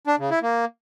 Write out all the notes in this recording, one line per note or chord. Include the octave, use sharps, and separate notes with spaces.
D4
C#3
E4
A#3